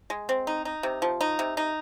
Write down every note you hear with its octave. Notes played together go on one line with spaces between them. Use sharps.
G#3
C4
D#4
D#4
C3
F3
D#4
C3
D#4